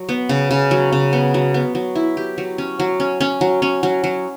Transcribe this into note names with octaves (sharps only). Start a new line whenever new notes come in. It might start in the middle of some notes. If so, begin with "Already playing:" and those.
Already playing: F#3
B3
C#3
C#3
F#3
C#3
B3
F#3
B3
F#3
E4
G4
F#3
C#4
F#3
C#4
C#4
F#3
C#4
F#3
F#3